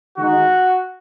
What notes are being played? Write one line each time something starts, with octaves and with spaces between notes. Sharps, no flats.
D#3 G#3 D#4 F#4